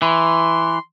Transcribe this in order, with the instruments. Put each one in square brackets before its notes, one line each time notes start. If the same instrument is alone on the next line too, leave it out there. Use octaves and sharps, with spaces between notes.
[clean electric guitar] E3 [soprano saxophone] C6